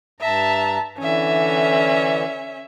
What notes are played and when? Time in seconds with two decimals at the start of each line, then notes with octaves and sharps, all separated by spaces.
0.21 G2 E5 A5 A#5
0.98 D3 E3 C#4 E5